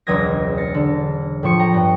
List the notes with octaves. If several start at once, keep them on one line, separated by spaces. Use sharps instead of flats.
E1 C#2 F#3 D#5 G#6 A#6
A6 A#6 C7 C#7
D3
A2 F3 C#6 C#7
G5 A#5
G2 B3